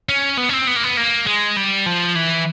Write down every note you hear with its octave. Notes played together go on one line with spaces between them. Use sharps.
C#4
B3
C#4
C4
B3
A#3
B3
A#3
G#3
G3
F3
E3